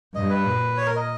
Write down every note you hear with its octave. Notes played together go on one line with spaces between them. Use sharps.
G2 D#5
B4
A#2
C#5
A#4
D#5